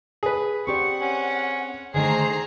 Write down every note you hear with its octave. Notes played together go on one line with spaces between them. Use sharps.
G#4 B4
C4 G4 D5 F#5 C#6
C#4
D3 D#3 A3 G#4 C5 A#5 C7